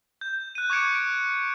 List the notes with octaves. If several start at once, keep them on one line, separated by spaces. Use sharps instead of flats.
G6
F#6 D#7
C#6 D6 G#6 C#7 D7
D7